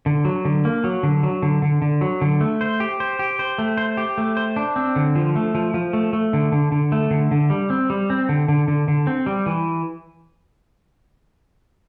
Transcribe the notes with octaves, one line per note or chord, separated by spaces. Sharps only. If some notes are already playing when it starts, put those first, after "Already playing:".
D3
F#3
D3
A#3
F#3
D3
F#3
D3
D3
D3
F#3
D3
A3
C5
G4
C5
G4
C5
A3
C5
G4
A3
C5
D4
C4
D3
F3
A3
F3
F3
A3
A3
D3
D3
D3
A3
D3
D3
G3
C4
G3
C4
D3
D3
D3
D3
C4
G3
E3